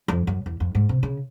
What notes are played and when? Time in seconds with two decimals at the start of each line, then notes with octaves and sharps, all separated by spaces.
0.08 F2
0.27 F#2
0.46 E2
0.60 F2
0.75 G#2
0.89 C3
1.03 C#3